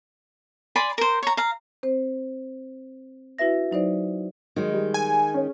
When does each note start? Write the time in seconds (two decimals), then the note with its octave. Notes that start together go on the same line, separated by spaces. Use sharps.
0.76 D5 G#5 B5 C6
0.98 A#4 C5
1.23 C#5 A#5
1.37 F5 A#5
1.83 C4 C5
3.39 E4 F#4 B4 E5 A#6
3.71 F#3 D#4 C5 D5
4.56 D#3 F#3 G#3 G#4
4.73 G3
4.94 G#5
5.34 C#4